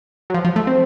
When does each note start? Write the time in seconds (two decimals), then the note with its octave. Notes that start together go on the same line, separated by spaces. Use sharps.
0.30 F#3
0.34 F3
0.45 F3
0.56 A3
0.67 C4